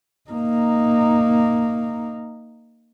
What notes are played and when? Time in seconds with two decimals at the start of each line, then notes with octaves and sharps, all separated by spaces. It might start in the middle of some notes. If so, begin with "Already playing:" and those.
0.31 A#3 D#4